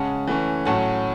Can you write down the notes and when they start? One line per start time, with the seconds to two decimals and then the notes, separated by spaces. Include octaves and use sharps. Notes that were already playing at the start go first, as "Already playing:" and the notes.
Already playing: C#3 G#3 C#4 F#5 A5
0.27 E3 A3 C#4
0.66 A2 F#3 C#4 F#5 A5